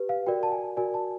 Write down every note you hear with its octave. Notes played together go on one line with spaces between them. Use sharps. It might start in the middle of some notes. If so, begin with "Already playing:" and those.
Already playing: G4 B4
F5
F#4 A#4 D5 G5
A5
G#5
F#4 A#4 D5 G#5
A5